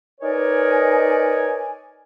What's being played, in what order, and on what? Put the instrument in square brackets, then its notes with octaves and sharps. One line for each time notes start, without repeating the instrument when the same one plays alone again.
[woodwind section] D#4 A#4 B4 C#5 D5 G#5